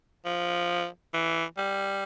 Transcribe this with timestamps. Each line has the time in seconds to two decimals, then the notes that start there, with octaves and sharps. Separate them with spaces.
0.25 F3
1.14 E3
1.57 G3